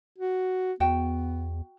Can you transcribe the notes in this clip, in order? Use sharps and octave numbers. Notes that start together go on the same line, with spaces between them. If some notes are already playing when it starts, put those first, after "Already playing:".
F#4
E2 B3 F#4 G5